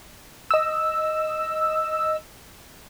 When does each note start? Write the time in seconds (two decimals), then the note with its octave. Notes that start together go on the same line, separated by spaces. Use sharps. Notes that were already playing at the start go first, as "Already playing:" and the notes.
0.51 D#5 E6